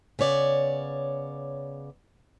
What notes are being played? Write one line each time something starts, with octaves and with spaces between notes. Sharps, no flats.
C#3 B3 C#5 D5